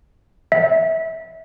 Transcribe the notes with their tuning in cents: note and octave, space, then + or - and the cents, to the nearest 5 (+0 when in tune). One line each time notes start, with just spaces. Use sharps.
E5 -25